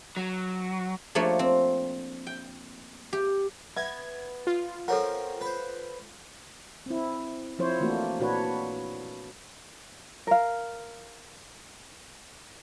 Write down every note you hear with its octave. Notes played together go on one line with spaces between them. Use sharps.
F#3
F3 A3 A#3 D4 C#5
C4
G5
G4
B3 E5 G#6
F4
C4 C#4 A4 A#4 C#5 F#5
B4 C5
C4 E4
F3 C4 E4 C5 C#5
E3 A3 A#3 D4 F#4
A#2 D4 F#4 B4 C#5 F#5
A#4 F5